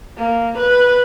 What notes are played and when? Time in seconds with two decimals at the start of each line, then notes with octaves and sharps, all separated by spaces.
0.17 A#3
0.58 B4